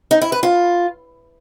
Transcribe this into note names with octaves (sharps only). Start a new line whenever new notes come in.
D#4
E4
B4
F4